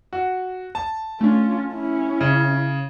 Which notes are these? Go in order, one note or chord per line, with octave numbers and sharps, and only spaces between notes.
F#4
A5
A3 C#4 D4 F4
C#4 E4
C#3